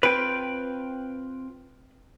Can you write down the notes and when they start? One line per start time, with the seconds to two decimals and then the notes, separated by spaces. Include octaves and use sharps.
0.03 C4 F4 B4 G5